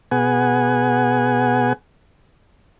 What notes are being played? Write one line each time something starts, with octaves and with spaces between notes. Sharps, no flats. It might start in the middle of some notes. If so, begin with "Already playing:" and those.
B2 B3 G#4 F#5 G#5